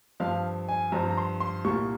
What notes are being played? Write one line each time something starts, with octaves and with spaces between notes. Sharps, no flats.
G2 F3 C4 F5
G#5
G2 F3 C4 A#5
A#5
C6
C6
C2 A#2 G3 A#3 C#6